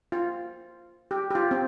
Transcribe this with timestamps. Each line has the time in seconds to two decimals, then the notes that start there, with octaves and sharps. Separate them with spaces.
0.12 F4
1.11 G4
1.30 G4
1.35 F4
1.51 C4